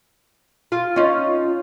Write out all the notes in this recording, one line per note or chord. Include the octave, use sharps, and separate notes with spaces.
F4
C#4 D#4 F4